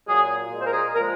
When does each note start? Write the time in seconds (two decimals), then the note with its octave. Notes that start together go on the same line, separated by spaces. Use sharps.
0.07 A#2 F#3 G#4
0.51 A#2 G#3
0.59 C5
0.66 A#4
0.73 G#4
0.95 A#2 F3 G#3 A#4